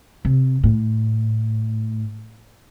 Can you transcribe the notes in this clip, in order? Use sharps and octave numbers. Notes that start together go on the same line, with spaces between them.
C3
A2